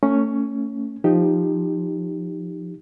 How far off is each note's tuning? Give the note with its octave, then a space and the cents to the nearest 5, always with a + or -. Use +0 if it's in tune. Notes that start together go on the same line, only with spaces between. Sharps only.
A3 +35 C#4 +0
F3 +0 D#4 +0 G4 +5